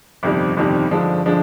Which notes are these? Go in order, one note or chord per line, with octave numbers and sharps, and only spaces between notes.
G1 F2 C3 D#3 G3
G1 F2 C3 D#3 G3
G2 D3 F3 G#3 D4
D3 F3 G#3 D4